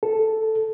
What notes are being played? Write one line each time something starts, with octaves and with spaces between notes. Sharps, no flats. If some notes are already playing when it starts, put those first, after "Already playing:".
A4